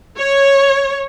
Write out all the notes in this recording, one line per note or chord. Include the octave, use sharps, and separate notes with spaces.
C#5